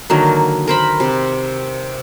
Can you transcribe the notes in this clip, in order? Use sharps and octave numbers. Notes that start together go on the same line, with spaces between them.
D3 D#3 F#3 A#3
A#4 C5 B5
C3